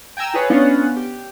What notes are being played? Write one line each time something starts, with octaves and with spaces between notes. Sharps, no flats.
G5 G#5 A#5 E6
F4 G#4 B4 C#5
B3 C#4 D4 F4 F#5
G4